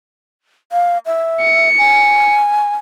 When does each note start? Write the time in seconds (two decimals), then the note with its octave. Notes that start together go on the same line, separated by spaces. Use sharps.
0.72 F5
1.06 E5
1.41 C#7
1.78 G#5